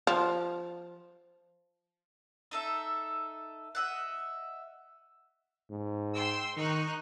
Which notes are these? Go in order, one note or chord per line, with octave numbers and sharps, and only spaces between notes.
F3
D#4 A4 E5
D#5 E5 F#5
G#2
G5 C6 E6
D#3 D#4 C#6 F#6